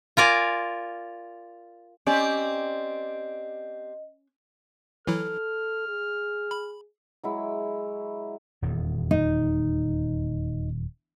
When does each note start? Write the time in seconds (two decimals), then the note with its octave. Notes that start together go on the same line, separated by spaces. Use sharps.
0.17 F4 A#4 D5 G#5
2.07 C4 C#4 G4 D5 D#5
5.07 E3 F#3 E4 A4 F6
5.88 G#4
6.51 B5
7.24 F#3 G#3 E4
8.62 D#1 E2
9.11 D#4